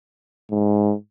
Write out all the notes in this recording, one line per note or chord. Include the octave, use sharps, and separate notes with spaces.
G#2